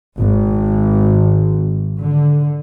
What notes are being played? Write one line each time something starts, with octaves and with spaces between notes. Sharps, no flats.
G#1
D3